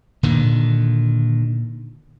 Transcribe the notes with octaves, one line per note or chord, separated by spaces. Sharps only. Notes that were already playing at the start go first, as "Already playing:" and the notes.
A#2 D3 D#3